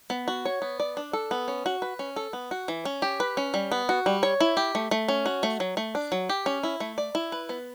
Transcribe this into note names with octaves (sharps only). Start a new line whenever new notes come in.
B3
F#4
C#5
B3
D5
D4
A4
B3
C#4
F#4
B4
C#4
A4
B3
F#4
E3
C#4
G4
B4
C#4
G3
B3
F#4
G3
C#5
E4
G4
A3
A3
C#4
F#4
A3
F#3
A3
D4
F#3
G4
C#4
E4
A3
D5
E4
B4
B3